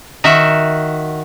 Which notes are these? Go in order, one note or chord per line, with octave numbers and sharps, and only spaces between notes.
D#3 F#4 E5